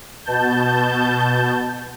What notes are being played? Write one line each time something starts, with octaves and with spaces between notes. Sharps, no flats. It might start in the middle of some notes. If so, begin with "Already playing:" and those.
B2 A5 G6